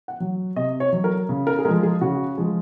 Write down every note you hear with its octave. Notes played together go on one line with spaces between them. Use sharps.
F#5
F#3
C3 D#5
C#5
F#3
A#4
C#3
A#4
G#4
F3 G#3 A#4
G#4
C#3 F#4
F3 G#3